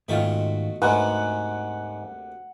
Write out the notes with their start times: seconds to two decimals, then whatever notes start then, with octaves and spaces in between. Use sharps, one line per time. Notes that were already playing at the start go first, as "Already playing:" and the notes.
0.08 G#2 B2 D#3 A3 F4 F#4
0.82 D2 G#2 C3 A#3 B4 F#5